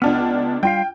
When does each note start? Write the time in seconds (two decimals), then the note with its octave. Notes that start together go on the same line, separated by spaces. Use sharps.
0.02 C#2 B3 D4 F6
0.63 G3 F4 F5 G5